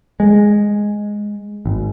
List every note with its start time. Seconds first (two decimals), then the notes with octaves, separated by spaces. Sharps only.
0.20 G#3
1.65 G#1